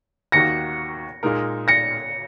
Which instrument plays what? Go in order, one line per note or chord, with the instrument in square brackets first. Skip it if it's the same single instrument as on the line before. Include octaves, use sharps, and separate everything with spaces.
[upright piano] D#2 D#3 A#3 D#4 F#4 [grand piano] A#6 C#7
[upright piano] A#2 G#3 D#4 A#4
[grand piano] A#6 C#7